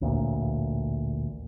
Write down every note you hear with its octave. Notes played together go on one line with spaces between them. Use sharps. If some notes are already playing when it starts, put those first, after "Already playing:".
A1 D2 A#2